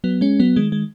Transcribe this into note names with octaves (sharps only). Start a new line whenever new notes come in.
F#3 B3
G#3 C#4
F#3 B3
D#3 G#3
G#3